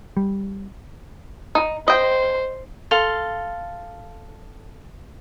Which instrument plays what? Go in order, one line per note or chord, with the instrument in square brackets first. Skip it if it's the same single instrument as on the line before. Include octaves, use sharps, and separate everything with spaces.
[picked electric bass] G3
[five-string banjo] D#4
[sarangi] C5 [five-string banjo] D#5 G5
[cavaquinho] A4 F5 C6